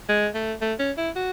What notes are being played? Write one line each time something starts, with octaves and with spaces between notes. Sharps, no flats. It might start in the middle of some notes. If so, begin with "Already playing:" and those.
G#3
A3
A3
C#4
E4
F#4